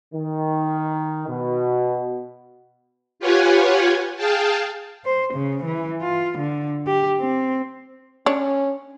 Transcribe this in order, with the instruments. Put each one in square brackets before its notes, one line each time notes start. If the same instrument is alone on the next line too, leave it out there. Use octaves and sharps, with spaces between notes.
[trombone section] D#3
B2
[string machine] F4 G4 B4 C#5 F#5 G#5
G#4 F5 G5 A5
[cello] C5
C#3
E3
F4
D3
G4
C4
[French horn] C#4 [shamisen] D4 C#5